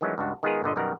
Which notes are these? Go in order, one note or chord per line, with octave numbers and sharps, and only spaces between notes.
D#3 E3 F#3 G#3 A3 C#4
C#2 G2 D4 F#4
D#3 G#3 B3 F4 G#4 A#4
G1 A#2 D3 D#5
F#2 B2 D#3 G3 A#4 F#5